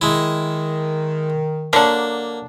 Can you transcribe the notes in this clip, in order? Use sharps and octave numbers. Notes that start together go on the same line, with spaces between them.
D#3 G#3 E4
D3 F#3 A#3 D4